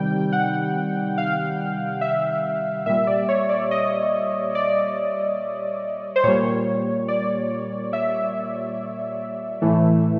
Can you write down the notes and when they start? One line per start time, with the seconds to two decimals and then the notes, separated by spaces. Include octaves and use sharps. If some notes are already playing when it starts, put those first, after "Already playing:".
Already playing: C3 D#3 G3 G5
0.33 F#5
1.18 F5
2.01 E5
2.86 A#2 G3 E5
3.07 D5
3.29 C#5
3.49 D5
3.71 D#5
4.55 D5
6.16 C5
6.24 A#2 G3 C#5
7.08 D5
7.93 E5
9.62 A2 E3 A3